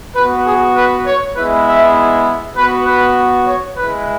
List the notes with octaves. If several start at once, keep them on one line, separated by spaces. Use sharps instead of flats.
B3 F#4 B4
G#4
B4
C#5
G#3 B3 E4 B4
E5
B3 F#4 B4
B4
C#5
G#3 E4 B4